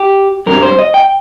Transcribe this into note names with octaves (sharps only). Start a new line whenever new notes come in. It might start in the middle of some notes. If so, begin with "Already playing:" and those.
Already playing: G4
G2 G3 C4 A#4
C5
D#5
G5